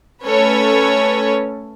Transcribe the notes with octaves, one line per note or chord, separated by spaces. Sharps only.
A3 C#4 A4 B4 C#5